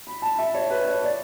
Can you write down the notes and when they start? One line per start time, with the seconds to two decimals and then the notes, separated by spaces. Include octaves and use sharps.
0.07 B5
0.22 A5
0.38 E5
0.54 C#5
0.70 B4
0.85 C#5
1.02 D5